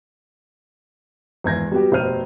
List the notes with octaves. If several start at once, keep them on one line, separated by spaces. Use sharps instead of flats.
G#1 E2 G#6 A#6
G3 B3 F#4 G4
F1 B2 C5 F6 D#7